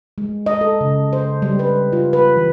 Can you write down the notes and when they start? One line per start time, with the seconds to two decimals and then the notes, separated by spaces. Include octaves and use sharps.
0.18 G#3
0.46 D#5
0.61 A4
0.81 C#3
1.13 C5
1.42 G3
1.59 B4
1.93 F4
2.13 B4
2.36 E3